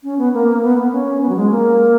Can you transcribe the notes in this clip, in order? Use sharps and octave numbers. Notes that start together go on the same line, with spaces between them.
C#4
B3
A#3
A#3
B3
B3
C#4
B3
F#3
G#3
A#3